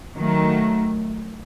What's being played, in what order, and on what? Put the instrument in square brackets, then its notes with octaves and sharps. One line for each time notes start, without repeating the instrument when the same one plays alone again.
[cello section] D#3 F#3 A3